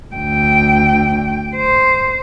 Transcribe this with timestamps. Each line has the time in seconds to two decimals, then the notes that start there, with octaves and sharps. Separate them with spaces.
0.15 D2 G5
1.55 C5